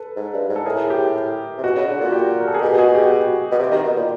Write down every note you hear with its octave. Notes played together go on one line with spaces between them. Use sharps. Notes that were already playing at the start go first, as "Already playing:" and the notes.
Already playing: A4 B4
G#2
G2
G#2
A4
A2 G#4 A#4
G4
C3
B2 F#4
C#3
D3
A#2 F#4
G4
A#4
A4
G#4
B2 G4
F#4 G#4
F#4
G4
G4
F#4
B2
C3 G4
D#3
B2
A#2